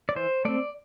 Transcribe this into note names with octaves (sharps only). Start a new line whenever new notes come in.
D5
E3 C5
A3 C4 D5